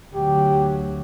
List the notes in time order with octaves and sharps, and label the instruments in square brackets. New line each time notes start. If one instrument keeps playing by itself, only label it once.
[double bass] D2 F#3 [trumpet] G4